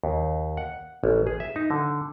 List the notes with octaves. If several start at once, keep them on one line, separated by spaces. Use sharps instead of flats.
D#2
F#5
A1
G#4
E5
D#4
D3